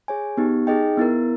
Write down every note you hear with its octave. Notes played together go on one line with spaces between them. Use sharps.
G#4 C#5 G#5
B3 D#4 G4
D#4 G#4 D#5 G5
B3 E4 A#4